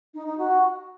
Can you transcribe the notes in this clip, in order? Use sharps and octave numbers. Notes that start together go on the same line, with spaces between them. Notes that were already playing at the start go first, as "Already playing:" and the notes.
D#4
D#4
F#4